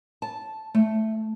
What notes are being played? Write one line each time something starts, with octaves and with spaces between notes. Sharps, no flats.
A5
A3